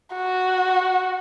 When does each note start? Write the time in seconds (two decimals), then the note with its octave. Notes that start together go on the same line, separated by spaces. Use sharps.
0.14 F#4